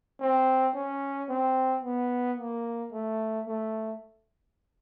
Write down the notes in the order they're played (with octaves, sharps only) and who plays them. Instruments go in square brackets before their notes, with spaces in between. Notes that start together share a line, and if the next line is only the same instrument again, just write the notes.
[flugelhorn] C4
C#4
C4
B3
A#3
A3
A3